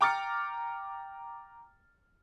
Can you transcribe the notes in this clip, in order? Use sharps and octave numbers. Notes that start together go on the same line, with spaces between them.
G5 A#5 D6 F6 A6 C#7